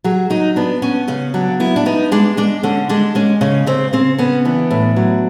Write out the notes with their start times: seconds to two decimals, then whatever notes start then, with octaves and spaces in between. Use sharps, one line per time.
0.04 F#3 G#4
0.30 F#3 D#4
0.56 B3 D4
0.82 B3 C#4
1.08 C#3 C#4
1.34 F#3 D4
1.60 B3 E4
1.76 D4
1.86 B3 D#4
2.12 G#3 D4
2.37 G#3 D4
2.63 D3 C#4
2.89 G#3 D4
3.15 G#3 C#4
3.41 C#3 C#4
3.67 C#3 C4
3.93 C#3 C4
4.18 B3 C#4
4.45 E3 D4
4.71 A2
4.96 F#3